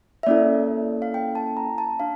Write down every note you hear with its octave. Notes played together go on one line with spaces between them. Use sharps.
E5
A#3 C#4 E4 A4 D5
F5
G5
A5
A#5
A5
D4 F5